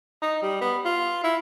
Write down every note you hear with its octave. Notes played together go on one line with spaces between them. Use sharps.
D#4
G3
B3
F4
E4